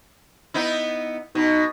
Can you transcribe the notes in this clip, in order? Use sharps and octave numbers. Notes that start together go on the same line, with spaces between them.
B3 D#4 E4
B2 D#4